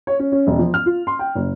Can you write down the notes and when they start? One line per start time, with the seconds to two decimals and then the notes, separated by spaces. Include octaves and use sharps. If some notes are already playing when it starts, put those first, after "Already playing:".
0.07 C#5
0.19 C#4
0.32 C#4
0.47 E1
0.59 F3
0.74 F6
0.86 F4
1.07 C6
1.19 G5
1.35 F#1